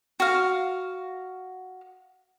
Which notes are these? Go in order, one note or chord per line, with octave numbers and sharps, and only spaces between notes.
F#4 F5